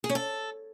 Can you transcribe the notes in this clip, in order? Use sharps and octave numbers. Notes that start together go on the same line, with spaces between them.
G#4
C#4
A4